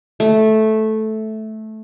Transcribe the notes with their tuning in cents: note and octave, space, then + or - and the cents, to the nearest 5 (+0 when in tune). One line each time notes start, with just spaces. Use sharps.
A3 -10